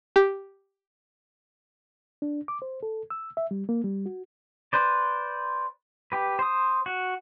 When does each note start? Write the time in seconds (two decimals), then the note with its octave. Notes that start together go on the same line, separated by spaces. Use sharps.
0.16 G4
2.22 D4
2.48 D6
2.62 C5
2.83 A4
3.10 E6
3.37 E5
3.51 G3
3.69 A#3
3.84 G3
4.06 F#4
4.73 B4 C5 D5
6.12 G4 B4
6.39 C5 D#6
6.86 F#4